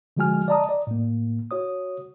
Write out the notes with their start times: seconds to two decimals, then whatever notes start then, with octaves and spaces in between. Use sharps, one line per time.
0.17 D3 F3 G#3 F#4 G#5 F6
0.48 D5 D#5 A5 A#5 D#6
0.69 D5
0.87 A2 A#3
1.51 F#4 C#5 D#6